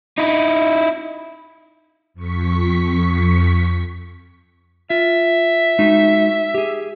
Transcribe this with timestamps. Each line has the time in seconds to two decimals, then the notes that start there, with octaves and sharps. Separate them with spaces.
0.18 D#4 E4
2.14 F2 C#6 B6
4.90 F4 E5
5.79 G#3 D#4 F#4
6.54 G4 G#4